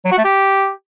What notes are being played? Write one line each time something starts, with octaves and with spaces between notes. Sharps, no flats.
F#3
F#4
A3
G4